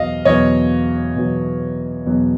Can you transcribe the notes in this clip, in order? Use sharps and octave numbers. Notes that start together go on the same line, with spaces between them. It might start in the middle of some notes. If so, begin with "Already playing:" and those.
Already playing: E2 B2 F#3 D#5 F5
E2 B2 F#3 C#5 D#5
E2 B2 F#3
E2 B2 F#3